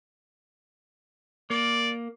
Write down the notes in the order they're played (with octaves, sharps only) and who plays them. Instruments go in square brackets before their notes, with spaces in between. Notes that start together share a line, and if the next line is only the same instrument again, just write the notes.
[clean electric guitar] A#3 [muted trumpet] D5